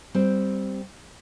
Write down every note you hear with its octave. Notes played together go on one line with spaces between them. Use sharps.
G3 C4